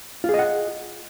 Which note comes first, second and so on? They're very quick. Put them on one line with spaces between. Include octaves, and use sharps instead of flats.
F4 G#4 D#5 F#5